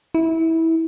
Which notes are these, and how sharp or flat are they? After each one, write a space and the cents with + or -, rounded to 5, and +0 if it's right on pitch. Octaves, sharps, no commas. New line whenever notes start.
E4 -20